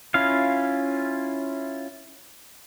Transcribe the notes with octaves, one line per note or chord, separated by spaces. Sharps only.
C#4 E4 F4 F5